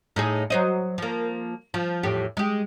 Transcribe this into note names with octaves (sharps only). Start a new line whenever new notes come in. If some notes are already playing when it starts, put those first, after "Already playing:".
A2 D#4 G#4
F#3 C5 D#5
F3 A#3
F3
E2 A2 G4
G#3 G4